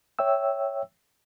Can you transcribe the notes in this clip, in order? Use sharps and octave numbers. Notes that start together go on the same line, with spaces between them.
C#5 E5 G5 E6